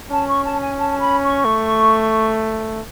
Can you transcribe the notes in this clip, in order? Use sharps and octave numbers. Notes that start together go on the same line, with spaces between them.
C#4 A5
C#6
A5
G#5
A5
B5
C#6
A3